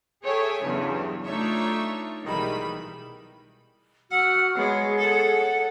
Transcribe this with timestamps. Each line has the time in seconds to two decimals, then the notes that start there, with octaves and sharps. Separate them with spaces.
0.24 G#4 A4 C#5 E5 G5 G#5
0.64 E2 G2 C#3 E3 F#3
1.25 A3 D4 D#4 F4 C#5 E5
2.24 B1 D#3 E3 G3 G#3 B5
4.12 F#4 F#5 E6 F6
4.56 G#3 B3 G#4 C#5
4.99 A4 F#5